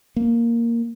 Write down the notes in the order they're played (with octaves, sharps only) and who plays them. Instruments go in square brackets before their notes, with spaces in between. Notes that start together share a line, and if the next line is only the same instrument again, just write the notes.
[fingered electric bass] A#3